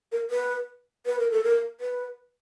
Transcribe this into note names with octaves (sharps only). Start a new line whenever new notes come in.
A#4
B4
B4
A#4
A4
A#4
B4